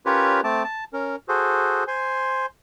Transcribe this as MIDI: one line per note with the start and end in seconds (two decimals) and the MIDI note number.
0.06 0.41 61
0.06 0.41 65
0.06 0.41 67
0.06 0.41 70
0.06 0.41 71
0.06 0.41 73
0.44 0.64 57
0.44 0.64 60
0.44 0.64 81
0.44 0.64 86
0.64 0.84 81
0.93 1.16 61
0.93 1.16 70
1.28 1.84 66
1.28 1.84 68
1.28 1.84 69
1.28 1.84 72
1.88 2.46 72
1.88 2.46 80
1.88 2.46 84